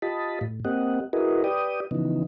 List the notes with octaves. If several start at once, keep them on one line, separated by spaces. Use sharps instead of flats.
F4 G4 D#5 A5 B5
A2
A#3 C4 G4 D#5 F#5
E4 F#4 G#4 A#4 B4 D#5
G4 B4 D5 G5 D#6
C#3 E3 F3 B3 D#4